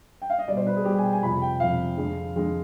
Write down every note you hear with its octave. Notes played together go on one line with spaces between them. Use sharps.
G5
F5
D#5
B2 G3 D5
C5
B4
G#4
B2 G3 G4
G#5
G5
G#5
F2 C3 F3 B5
G5
F2 C3 F3 F5
F2 D3 G#3
F2 D3 G#3